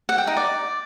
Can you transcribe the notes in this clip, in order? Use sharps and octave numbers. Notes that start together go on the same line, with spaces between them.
F#5
G5
D#4
D5